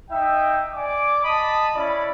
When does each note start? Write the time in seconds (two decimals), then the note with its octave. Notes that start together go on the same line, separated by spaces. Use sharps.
0.10 D#4 E5 G5
0.73 D5 G#5 D6
1.23 D#5 A5 B5 D#6
1.75 C#4 E4 D5 B5